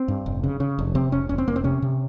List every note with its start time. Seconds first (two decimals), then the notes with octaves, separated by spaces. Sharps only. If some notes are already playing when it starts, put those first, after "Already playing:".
Already playing: C4
0.08 G2
0.26 F1
0.44 C#3
0.60 C#3
0.79 F1
0.95 C3 C4
1.12 F1 C#4
1.29 F1 C#4
1.38 C4
1.47 F1 A#3
1.56 C4
1.64 C3 C#4
1.82 C3